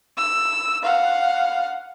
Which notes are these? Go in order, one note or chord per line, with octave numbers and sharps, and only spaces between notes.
E6
F5 F#5